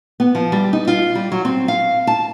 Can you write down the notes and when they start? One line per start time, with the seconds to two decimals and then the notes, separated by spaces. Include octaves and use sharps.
0.20 B3
0.35 F3
0.52 G3
0.73 D#4
0.87 F4
1.15 G3
1.32 F#3
1.45 C4
1.68 F5
2.07 A5